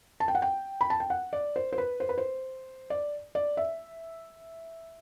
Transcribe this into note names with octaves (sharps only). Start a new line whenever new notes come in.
A5
G5
F#5
G5
B5
A5
G5
F#5
D5
C5
C5
B4
C5
B4
C5
D5
D5
E5